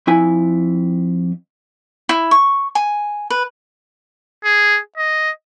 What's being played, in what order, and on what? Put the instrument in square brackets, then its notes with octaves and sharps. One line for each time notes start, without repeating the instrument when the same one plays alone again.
[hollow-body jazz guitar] F2 E4 G#5
[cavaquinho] E4
C#6
G#5
B4
[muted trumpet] G#4
D#5